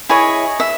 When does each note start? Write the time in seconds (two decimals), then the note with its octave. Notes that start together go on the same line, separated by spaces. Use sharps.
0.09 E4 G#4 C#5 D#5
0.60 E5